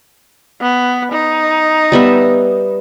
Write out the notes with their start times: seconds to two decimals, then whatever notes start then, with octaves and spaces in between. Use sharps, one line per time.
0.60 B3
1.12 D#4
1.92 G3 B3 E5